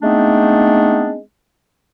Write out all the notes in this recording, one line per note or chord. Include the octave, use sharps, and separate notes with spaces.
G#3 A3 B3 C4 D4 D#4